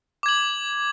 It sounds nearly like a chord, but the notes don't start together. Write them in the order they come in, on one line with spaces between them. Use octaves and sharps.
D6 G#6 F#7